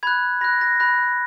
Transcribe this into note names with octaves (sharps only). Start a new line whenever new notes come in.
B5 F#6 G#6
B5 F#6 A#6
A#6
B5 F#6 A#6